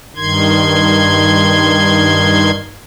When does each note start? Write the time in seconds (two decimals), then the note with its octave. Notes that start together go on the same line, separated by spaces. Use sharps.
0.16 G2 D#3 C6 G#6